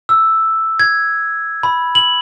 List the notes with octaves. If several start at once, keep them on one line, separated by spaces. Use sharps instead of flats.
E6
G#6
B5
F#7